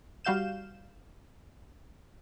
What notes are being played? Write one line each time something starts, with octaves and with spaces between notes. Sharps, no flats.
G3 F#4 F5 G6 E7